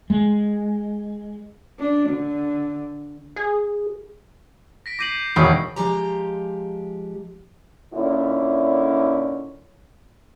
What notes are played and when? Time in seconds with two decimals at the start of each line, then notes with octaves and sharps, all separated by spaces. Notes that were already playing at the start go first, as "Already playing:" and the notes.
0.10 G#3
1.79 D4
2.09 D3
3.36 G#4
4.86 A#6 B6 D7
4.99 D6 G6 A#6 C7 D#7 F#7
5.36 E1 E2 D#3 G5 B5 C#6 C7
5.76 F3 G#3 G4 A#5
7.94 A#2 D3 C#4 D#4 E4